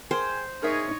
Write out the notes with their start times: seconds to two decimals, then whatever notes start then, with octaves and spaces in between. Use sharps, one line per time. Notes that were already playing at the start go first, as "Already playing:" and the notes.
0.11 G#4 A#4 C5 G5 G#5
0.63 D#4 G#4 A#4 C#5 E5